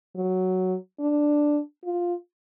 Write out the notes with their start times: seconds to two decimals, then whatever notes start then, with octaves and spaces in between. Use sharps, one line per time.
0.16 F#3
1.00 D4
1.85 F4